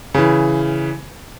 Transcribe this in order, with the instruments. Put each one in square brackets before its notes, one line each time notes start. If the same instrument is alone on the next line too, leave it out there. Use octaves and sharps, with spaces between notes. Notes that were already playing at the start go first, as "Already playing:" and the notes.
[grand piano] C#3 E3